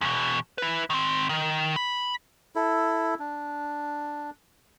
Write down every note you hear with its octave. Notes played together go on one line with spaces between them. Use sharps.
E2 B2
E4 B4
D#3 C4
D#3
B5
E4 A4
D4